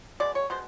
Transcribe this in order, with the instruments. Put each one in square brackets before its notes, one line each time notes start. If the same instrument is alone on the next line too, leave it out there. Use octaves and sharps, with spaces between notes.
[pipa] B2 G#3 D5
C#5
B2 G#3 C5